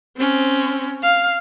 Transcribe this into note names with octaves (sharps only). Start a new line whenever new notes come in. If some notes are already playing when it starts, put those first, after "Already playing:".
C4 C#4
F5